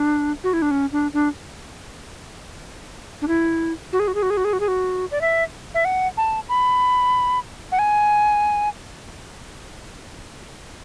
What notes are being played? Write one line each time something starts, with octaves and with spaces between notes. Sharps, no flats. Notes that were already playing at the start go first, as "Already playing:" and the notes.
Already playing: D4
F#4
E4
D4
C#4
D4
D4
D4
E4
F#4
G#4
F#4
G#4
F#4
G#4
F#4
G#4
F#4
G#4
F#4
D5
E5
E5
F#5
A5
B5
F#5
G#5